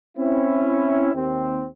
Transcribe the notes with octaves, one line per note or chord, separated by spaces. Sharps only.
C4 C#4 E4
D#2 C4